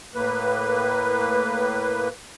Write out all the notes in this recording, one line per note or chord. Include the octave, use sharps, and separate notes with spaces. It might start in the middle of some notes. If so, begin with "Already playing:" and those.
A2 A#3 B4